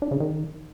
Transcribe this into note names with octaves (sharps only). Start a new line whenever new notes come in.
D4
C#3
D#3